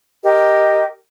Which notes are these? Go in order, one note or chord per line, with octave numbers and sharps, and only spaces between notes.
G4 A#4 D#5